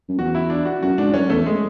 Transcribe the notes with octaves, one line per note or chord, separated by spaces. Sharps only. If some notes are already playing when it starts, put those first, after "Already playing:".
F#2
E2 F#4
E4
D4
F#4
F#2 F#4
G#2 D4
F#2 C#4
E2 A3
G#3